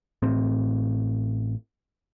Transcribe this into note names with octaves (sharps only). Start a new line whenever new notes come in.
A1 A2 C4